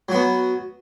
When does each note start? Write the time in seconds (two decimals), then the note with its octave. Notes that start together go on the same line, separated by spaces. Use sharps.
0.09 F#3
0.11 F#4
0.14 B3